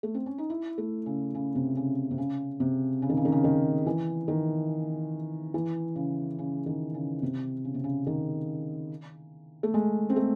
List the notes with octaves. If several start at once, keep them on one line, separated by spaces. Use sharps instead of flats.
A3
C4
C#4
D#4
E4
A3
C#3
C#3
C3
C#3
C3
C#3
C3
C#3
D#3
C#3
D#3
C#3
D#3
E3
D#3
E3
C#3
C#3
D#3
C#3
C3
C#3
C3
C#3
D#3
A3
G#3
C4
A3